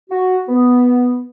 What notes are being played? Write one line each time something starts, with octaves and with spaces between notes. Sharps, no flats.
F#4
B3